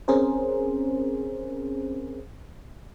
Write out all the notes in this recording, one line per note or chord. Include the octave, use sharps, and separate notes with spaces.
C4 C#4 G#4 A#4 C5